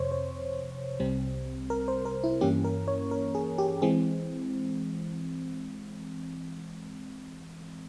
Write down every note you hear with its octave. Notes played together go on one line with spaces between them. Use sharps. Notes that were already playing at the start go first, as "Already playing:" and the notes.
Already playing: F2 C3 C5 C#5
C5
C2 C3 G3 C4
A#4
C5
A#4
E4
G2 E3 A#3 C#4 G4
A#4
C#5
A#4
G#4
G4
E3 G#3 C4 G#4